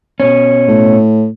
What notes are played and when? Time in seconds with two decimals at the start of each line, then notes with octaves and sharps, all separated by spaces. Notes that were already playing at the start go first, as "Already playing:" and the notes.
0.20 B2 C#4
0.68 A2